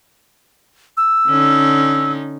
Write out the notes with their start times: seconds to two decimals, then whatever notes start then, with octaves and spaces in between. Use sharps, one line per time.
0.97 E6
1.28 D3 C#4 D#4